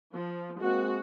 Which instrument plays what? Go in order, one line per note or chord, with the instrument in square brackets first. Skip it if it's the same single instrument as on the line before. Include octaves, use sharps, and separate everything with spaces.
[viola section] F3
[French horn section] G#3 A#3 C4 [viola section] F#4